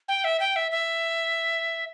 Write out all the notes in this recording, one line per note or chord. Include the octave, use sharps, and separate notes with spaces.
G5
E5
G5
E5
E5